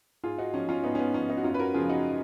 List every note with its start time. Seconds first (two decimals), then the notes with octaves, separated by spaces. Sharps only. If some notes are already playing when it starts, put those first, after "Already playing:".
0.23 G#2 F4 G#4
0.38 D#4 F#4
0.54 F3 C#4
0.69 C#4 F4
0.84 G#2 B3 D#4
0.95 C#4
0.99 B3
1.14 F3 C#4
1.29 B3 D#4
1.37 F#4
1.44 F#2 C#4 F4
1.54 B4
1.59 F#4 A#4
1.74 C#3 F3 F4 G#4
1.89 D#4 F#4